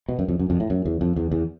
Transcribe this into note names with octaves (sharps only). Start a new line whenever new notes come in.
B2
F#2
F2
F#2
F2
A2
F#2
E2
F2
E2
E2